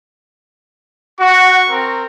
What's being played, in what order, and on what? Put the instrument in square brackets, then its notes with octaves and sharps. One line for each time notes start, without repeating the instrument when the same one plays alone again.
[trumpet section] F#4 [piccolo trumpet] C#6
[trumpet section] C4 A#4